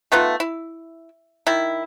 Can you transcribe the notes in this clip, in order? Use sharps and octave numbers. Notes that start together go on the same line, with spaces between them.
A3 B3 D#4 F4
E4
D#3 E4